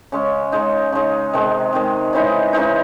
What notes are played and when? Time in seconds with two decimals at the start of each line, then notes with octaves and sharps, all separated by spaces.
0.12 C#3 G#3 C#4
0.52 C#3 G#3 D#4
0.92 C#3 G#3 D#4
1.33 C3 D#3 G#3
1.73 C3 D#3 G#3
2.13 C#3 E3 G#3 D#4
2.53 C#3 E3 G#3 D#4